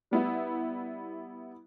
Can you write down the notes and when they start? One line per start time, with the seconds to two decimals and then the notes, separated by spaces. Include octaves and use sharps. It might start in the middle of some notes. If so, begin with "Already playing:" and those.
0.11 G3 B3 E4